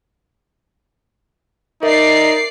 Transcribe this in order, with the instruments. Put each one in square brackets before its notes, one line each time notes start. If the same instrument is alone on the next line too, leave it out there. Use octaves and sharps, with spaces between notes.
[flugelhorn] D#4 [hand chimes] A#4 E5 [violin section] D5 C7